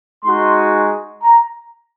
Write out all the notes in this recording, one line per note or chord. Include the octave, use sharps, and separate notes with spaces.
G#3 D#4 F#4 C6
A#5